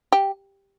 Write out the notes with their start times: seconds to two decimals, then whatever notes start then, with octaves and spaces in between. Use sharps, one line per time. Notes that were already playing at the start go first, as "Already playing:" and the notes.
0.12 G4